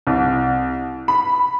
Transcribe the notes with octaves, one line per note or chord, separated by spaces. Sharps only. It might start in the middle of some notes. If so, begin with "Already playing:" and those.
C2
B5